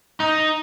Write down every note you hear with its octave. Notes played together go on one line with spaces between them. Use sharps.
D#4